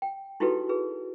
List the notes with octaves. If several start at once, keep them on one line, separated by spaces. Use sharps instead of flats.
G5
D#4 E4 F#4 G4 A4 B4
G#4 B4